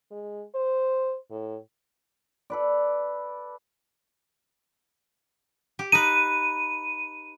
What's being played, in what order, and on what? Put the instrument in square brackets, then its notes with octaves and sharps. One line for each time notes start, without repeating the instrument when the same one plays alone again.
[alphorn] G#3
C5
A2
[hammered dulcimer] A4 B4 D5
[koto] G4
[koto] D#4 B4 [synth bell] D#7